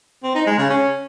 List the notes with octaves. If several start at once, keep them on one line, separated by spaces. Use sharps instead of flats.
C4
D#4
G#3
C#3
C#4